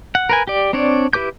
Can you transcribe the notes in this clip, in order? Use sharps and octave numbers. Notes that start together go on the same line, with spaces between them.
F#5
A#4 B4 G#5
G4 D5
C4 D4 C#5 D5
E4 G4 B4 D6 G6